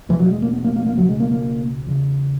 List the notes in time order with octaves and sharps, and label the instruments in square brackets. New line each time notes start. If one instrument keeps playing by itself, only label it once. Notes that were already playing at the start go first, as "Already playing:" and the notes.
[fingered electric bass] E2 B2 E3
F#3
G#3
A#3
B3
A#3
A#3
A#3
C#2 B2 F#3
G#3
A#3
A#3
E2 C#3